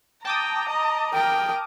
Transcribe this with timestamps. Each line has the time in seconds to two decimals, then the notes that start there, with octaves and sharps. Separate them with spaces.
0.25 G5 A5 A#5 D6 D#6
0.69 D#5
1.14 A#4 G5